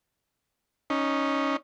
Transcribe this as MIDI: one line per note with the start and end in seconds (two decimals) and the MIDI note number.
0.90 1.56 61
0.90 1.56 63